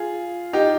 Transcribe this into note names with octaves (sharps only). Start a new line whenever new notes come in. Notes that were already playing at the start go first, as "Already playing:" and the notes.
Already playing: F4 G#4
D#4 G4